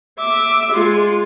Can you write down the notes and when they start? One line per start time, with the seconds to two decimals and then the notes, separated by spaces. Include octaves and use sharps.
0.19 E5 D6
0.71 G#3 F4